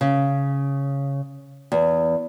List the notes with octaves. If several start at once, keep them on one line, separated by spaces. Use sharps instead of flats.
C#3
E2